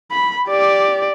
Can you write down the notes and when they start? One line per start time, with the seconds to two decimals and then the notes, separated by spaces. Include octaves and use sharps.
0.12 B5
0.48 G4 D5